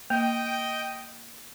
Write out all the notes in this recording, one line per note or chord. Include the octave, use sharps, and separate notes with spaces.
A#3 D#5 G5